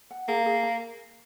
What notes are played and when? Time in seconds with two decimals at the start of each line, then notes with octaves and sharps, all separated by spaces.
0.11 F#5
0.28 A#3 G#4
0.46 G#4
0.63 A#5